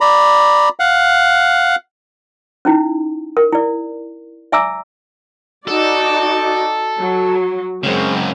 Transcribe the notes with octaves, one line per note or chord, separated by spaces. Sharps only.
D5 A#5 B5
F5 F#5
C#4 D#4 E4
A#4
E4 D5
D5 E5 G#5 A#5 D6 E6
D#4 F#4 A4 D5
F#3
F#2 C#3 G#3 A#3 C4